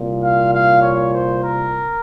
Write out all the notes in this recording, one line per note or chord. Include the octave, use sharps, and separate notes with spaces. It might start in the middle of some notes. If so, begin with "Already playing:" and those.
Already playing: C2 A#2
F5
F5
C#5
C5
A#4